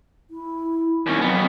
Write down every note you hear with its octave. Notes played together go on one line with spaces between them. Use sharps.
E4
D#2 C4 C#4
F2 F#3 B3